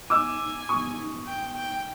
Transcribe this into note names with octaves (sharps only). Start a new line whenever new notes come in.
G#5 D6 E6
C#6 D#6
G5
G5